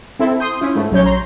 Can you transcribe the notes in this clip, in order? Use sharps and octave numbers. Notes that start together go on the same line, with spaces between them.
C4 E4 A4
C6 D#6 G6
C#4 E4 F4
G#2 A3
A#1 F#3 C#4 C#5 G6
A#5 C6